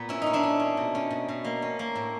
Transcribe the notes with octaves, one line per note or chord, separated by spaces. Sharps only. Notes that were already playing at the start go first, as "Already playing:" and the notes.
Already playing: A#2 B3
C#4 E4
C#4 D#4
D4 E4
C#4
C#4
B2
C#4
B2
B2
A#3
C#4
A#3
A2